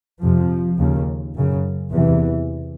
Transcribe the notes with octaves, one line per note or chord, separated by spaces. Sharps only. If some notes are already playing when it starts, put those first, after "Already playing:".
F2 C3 F3
D#2 C#3
F#2 C#3
E2 C3 E3